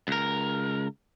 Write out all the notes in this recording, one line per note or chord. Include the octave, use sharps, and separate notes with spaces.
C#2 A#4